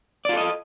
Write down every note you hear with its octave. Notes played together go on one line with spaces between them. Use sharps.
F4 A4 D5 D#5